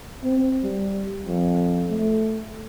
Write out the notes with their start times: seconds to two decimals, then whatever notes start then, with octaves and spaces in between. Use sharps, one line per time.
0.24 C4
0.63 G3
1.26 F2
1.90 A3